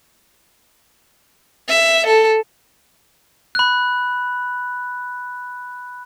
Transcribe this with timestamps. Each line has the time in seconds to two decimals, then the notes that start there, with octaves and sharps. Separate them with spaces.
1.68 E5
2.07 A4
3.55 B5 F#6